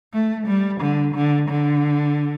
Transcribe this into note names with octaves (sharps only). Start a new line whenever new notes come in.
A3
G3
D3
D3
D3